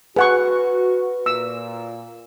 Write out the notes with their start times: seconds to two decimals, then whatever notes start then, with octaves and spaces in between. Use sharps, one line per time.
0.16 F#4 G#4 B4 F#5 C#6
1.26 A#2 E6